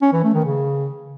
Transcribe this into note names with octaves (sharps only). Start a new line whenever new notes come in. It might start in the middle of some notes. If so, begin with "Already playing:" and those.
C#4
E3
A3
D#3
C#3